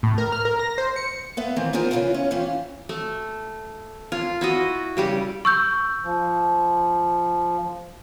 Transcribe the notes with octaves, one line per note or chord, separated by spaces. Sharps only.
A2
A#4
F6
A#4
A#6
C5
C#7
B3 B4 E5 F5
D#3 E3 C4
B3 D#4 F4 G#4 A#4 C5
C#3 E3 G#3 B3 E4 F4
C#4
E3 C4 C#4 F4
A3
F4
E4 F#4 D#5
C#3 G3 G4
C#6 E6 G6
F3